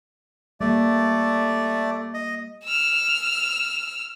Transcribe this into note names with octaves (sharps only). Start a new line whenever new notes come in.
G3 A3 A#3 D5
D#5
E6 F6